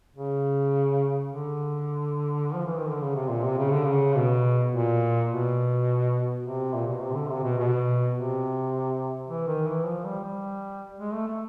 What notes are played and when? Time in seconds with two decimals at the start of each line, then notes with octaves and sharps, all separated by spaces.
0.16 C#3
1.31 D3
2.55 F3
2.66 E3
2.79 D#3
2.90 D3
3.02 C#3
3.16 C3
3.29 A#2
3.45 C3
3.58 C#3
3.72 D3
3.85 C#3
4.16 B2
4.73 A#2
5.30 B2
6.43 C3
6.75 A#2
6.88 B2
7.00 C3
7.15 D3
7.30 C3
7.43 B2
7.58 B2
8.15 C3
9.29 E3
9.47 D#3
9.67 E3
9.86 F3
10.05 G3
10.24 G3
11.00 G#3
11.13 A3
11.28 A3